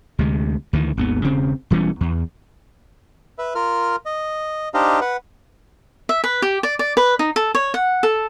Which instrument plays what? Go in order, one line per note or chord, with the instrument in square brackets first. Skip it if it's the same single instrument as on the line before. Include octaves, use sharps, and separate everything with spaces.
[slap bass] D2 C3 G#3
D2 D#3 E3
G#1 D#2 B3
E1 C#3 C4
E1 E3 G3 C#4
E2
[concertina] B4 E5
F4 A#4 F6
D#5
D4 D#4 G4 C5 D#5 F5
B4 F#5
[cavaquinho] E5
B4
G4
D5
D5
B4
D#4
A4
C#5
F#5
A4